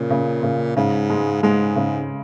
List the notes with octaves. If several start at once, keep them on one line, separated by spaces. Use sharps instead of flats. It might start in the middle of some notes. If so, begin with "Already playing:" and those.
Already playing: A#2 C#3
C#3
C#3
G#2 C#3
G#3
G#2 G#3
C#3